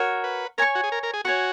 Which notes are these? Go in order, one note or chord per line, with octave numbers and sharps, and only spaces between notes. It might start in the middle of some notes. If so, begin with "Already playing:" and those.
Already playing: F#4 A#4 C#5
B4
A#4 C#5 G#5 C#6
F#4
G#4
A#4
A#4
G#4
F#4 C#5 G#5 C#6